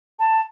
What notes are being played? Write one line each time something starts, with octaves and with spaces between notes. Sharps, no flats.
A5